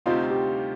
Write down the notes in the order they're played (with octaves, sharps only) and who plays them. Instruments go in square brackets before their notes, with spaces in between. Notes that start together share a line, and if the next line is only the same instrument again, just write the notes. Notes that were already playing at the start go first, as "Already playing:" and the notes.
[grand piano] D2 C3 G3 C4 D#4 [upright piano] F4
[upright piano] G4